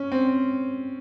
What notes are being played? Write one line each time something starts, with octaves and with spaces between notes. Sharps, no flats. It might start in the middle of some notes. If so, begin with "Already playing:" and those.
Already playing: C#4
C4